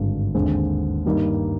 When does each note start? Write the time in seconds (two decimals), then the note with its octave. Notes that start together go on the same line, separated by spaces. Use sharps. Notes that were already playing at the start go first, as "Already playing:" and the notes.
Already playing: G#1 G2 D3 G#3 D4
0.35 D#2 D3 G#3 C4
1.05 G2 D#3 G3 A#3 D#4